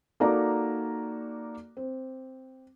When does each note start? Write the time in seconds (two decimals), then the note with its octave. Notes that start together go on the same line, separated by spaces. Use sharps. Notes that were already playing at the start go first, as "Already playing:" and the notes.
0.20 A#3 D#4 F#4 A4 D5 A#5
1.77 C4